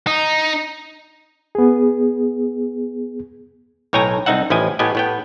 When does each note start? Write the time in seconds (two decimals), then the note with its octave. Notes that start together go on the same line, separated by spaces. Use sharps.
0.07 D#4
1.55 B3 G#4
3.93 B1 A2 C#5 G5 G#5 A#5
4.26 C2 C4 D#4 E5 F#5
4.50 A1 F3 E4 D#5 G#5
4.79 A2 B3 G4 D#5 G#5
4.95 A2 B3 G5